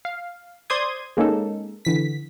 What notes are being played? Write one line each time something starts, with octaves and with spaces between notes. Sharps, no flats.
F5
C5 D5 C6 D#6 G#6
G#3 A#3 C#4 D#4 A4
D3 E3 B6